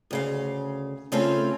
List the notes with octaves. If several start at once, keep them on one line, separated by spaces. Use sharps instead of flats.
D2 C#3 F5
C#3 A3 C4 C#4 F4 A4